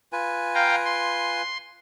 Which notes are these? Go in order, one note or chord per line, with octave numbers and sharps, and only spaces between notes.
F4 B4 G#5
F5 G5 A#5
C6